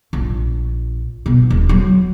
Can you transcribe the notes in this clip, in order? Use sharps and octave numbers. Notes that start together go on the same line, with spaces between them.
A#1
B2
D#1
F#3